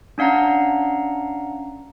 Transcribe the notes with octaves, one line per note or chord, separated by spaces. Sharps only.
C#4 D4 F5 F#5 A#5